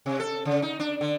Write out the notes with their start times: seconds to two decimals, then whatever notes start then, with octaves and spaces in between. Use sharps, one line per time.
0.06 C3
0.20 A4
0.45 C#3
0.62 D#4
0.80 D4
1.01 D3